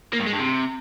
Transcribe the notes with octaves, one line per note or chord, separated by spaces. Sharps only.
A#3
G2
G#3
G2
C3